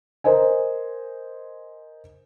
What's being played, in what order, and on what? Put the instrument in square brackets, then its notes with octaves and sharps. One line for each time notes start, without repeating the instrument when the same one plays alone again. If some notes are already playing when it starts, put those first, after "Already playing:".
[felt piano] A#4 C5 D#5 G#5